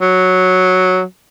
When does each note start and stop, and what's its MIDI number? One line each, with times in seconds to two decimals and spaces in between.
0.01 1.03 54